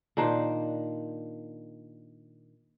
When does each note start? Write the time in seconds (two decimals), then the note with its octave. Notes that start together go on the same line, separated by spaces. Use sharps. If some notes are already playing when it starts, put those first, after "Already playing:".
0.17 A#2 D#3 D4 C5